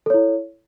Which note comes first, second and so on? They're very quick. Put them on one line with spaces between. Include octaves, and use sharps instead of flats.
A4 C#5 E4